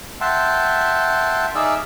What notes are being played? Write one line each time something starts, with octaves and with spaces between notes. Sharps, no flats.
E5 F#5 G5 A5 C6
D#4 G#4 D5 E5 F5 E6